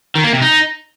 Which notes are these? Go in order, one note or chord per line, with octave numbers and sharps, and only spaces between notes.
D#3
A#3
C3
D#4